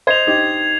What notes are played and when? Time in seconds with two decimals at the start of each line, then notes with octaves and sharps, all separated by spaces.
0.07 C5 D#5 G#6 C7 F7
0.27 D#4 G4